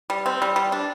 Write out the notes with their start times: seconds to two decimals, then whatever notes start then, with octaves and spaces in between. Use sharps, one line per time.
0.10 G3
0.26 C4
0.42 G3
0.56 G3
0.72 D4